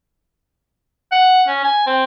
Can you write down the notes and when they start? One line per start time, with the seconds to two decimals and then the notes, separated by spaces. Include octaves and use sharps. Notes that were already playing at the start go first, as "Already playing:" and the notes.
1.12 F#5
1.48 C#4
1.64 G#5
1.87 C4